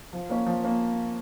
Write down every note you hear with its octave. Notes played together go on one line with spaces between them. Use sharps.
F3
A#3 C#4
F3
A#3 C#4